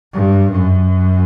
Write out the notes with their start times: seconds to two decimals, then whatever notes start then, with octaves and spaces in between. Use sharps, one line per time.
0.14 G2
0.52 F#2